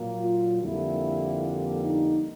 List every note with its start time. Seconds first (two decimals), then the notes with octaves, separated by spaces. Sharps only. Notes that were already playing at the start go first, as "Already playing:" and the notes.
Already playing: A#2 F#3 A#3
0.20 F4
0.61 F2 D3 G3 A#3 E4
1.81 D#4